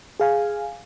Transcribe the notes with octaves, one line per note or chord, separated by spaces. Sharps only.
G#4 F5 G#5